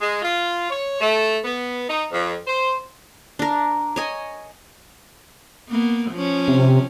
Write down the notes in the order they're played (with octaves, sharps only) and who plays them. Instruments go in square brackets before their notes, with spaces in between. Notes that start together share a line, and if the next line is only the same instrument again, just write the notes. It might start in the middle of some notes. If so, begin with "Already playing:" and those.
[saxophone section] G#3
F4
C#5
A3
B3
D#4
F2
C5
[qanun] D4 A#4
C#5 D#5 G#5
[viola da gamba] A#3 B3
F3 C#4
[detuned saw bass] C3